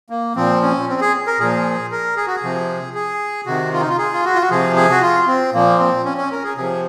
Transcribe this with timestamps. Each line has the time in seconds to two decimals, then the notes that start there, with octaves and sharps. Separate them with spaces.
0.10 A#3
0.36 A#2 F3 C4
0.62 C#4
0.89 C4
1.01 G#4
1.27 A#4
1.39 A#2 F3 G#4
1.91 A#4
2.17 G#4
2.27 F#4
2.36 G#4
2.43 C3 F3
2.95 G#4
3.46 C3 D#3 F#4
3.73 F4
3.81 D#4
3.88 F4
3.98 G#4
4.13 F4
4.25 F#4
4.35 F4
4.42 F#4
4.51 C3 F3 G#4
4.76 G#4
4.91 F#4
5.02 F4
5.27 C4
5.53 A#2 F3 A#3
5.79 C4
6.05 C#4
6.17 C#4
6.32 A#4
6.44 G#4
6.56 C3 F3 G#4